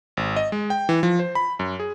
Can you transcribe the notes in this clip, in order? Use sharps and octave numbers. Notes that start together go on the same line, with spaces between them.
G#1
D#5
G#3
G5
E3
F3
C5
B5
F#2
G#4